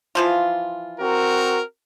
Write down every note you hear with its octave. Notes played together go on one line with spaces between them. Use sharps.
E3 F3 F4
C4 F#4 A#4